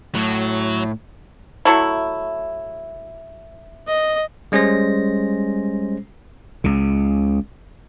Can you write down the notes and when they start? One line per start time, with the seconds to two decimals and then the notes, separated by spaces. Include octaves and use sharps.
0.15 A2 F#3
1.65 F#3 A3 E4
3.87 D#5
4.52 G3 G#3 C#4 G#4 C5 A#6
6.64 C#2 C#3